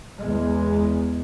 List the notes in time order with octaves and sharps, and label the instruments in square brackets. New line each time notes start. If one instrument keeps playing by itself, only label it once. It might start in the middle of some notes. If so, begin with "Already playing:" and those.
[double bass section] E2 G#3